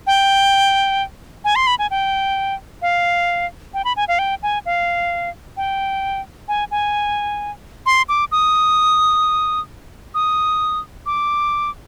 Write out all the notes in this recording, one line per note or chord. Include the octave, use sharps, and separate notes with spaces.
G5
G#5
C6
B5
G#5
G5
F5
G5
B5
G#5
F5
G5
G#5
F5
G5
G#5
G#5
C6
D6
D#6
D#6
D6